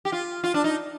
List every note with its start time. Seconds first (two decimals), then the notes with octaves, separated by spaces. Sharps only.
0.05 G4
0.12 F4
0.44 F4
0.54 D4
0.64 D#4